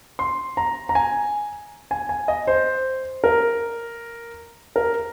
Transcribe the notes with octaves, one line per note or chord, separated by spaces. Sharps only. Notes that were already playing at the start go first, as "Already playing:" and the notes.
C6
A#5
A#5
G#5
G#5
G#5
D#5
C5
A#4
A#4